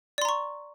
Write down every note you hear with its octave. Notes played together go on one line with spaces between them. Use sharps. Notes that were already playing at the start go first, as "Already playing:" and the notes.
D5 A#5 C6 C#6